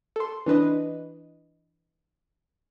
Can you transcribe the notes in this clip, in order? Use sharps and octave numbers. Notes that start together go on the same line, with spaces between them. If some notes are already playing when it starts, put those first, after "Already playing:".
A4 C6
E3 D4 B4 D#5